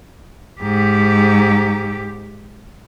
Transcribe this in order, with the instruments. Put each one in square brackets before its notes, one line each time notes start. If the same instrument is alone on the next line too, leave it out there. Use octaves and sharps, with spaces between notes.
[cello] G#2 G4